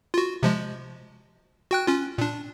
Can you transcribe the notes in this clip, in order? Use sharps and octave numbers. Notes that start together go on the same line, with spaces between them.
F4 F#4
C3 F3 G#3
F#4 G5 F#6
C#4 F4
A#2 D4